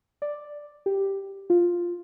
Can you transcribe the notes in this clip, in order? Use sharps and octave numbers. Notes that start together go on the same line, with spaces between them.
D5
G4
F4